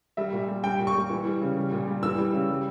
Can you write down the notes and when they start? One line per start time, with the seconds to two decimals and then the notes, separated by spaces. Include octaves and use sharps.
0.17 G3 E5
0.33 A#2
0.48 G3
0.63 G3 G5
0.79 A#2
0.87 C#6
0.95 G3
1.10 E3
1.25 G3
1.41 C#3
1.57 G3
1.72 A#2
1.88 G3
2.02 E3 E6
2.18 G3
2.34 C#3
2.49 G3